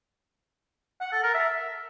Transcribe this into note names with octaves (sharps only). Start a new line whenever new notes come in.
F#5
A4
A#4
E5